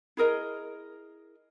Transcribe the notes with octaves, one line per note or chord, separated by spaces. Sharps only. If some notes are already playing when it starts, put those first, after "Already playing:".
E4 G#4 A#4 D#5